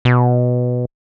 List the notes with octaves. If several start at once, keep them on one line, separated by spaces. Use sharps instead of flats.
B2